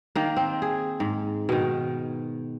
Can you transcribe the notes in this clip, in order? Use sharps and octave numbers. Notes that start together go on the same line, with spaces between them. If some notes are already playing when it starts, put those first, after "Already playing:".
D#3 A#3
C4
G#4
G#2
B2 D#3